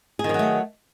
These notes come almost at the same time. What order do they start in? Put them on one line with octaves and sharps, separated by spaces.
G#4 D#3 F3 F#3 A3